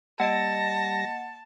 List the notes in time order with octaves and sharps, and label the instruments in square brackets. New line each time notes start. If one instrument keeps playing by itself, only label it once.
[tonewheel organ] G3 A#6 [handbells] A#3 D#5 D7 [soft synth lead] F#5 [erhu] A5